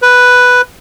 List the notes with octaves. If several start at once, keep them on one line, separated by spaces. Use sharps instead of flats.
B4